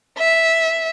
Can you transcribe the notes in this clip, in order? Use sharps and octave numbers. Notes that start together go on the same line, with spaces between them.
E5